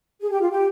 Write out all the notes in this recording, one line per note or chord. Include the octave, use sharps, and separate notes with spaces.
G#4
G4
F4
G4